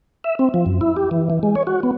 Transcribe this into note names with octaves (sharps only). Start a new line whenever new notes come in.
E5
C4
F3
F#2
E4
G4
E3
E3
G#3
C#5
F#4
B3